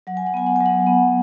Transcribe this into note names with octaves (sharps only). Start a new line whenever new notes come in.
F#3 F#5
G#5
F#5
B3 G#5
F#5
F#3 G#5
F#5
B3